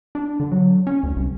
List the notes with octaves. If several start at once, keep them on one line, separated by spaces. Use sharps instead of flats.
D4
D3
F#3
C#4
D2
C2